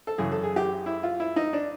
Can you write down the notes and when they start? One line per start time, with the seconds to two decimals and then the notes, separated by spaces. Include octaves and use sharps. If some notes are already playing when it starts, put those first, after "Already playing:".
0.07 A4
0.18 F#2 C#3 E3 G#4
0.32 A4
0.43 G#4
0.56 G4
0.86 E4
1.03 F4
1.20 E4
1.36 D#4
1.53 D4